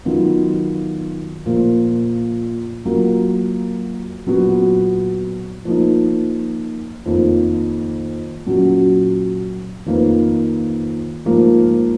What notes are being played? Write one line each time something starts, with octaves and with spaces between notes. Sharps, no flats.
D#3 F#3 B3 F4
A#2 F3 A#3 F4
F#3 A#3 F4 A#4
A#2 F#3 B3 F#4
F3 A#3 D#4
F2 D#3 A#3
A#2 F#3 C#4 F#4
F2 D#3 A#3 F4 B4
G#2 F3 A#3 F4